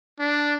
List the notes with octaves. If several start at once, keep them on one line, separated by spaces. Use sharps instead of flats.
D4